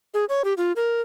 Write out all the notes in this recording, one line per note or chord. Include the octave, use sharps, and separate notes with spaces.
G#4
C#5
G4
F4
A#4